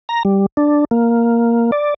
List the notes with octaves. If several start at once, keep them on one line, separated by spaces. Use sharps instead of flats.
A#5
G3
D4
A#3
D5